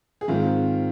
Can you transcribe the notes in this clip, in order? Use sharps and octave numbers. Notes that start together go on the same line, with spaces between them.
G#4
G#2 D#3 C4 F4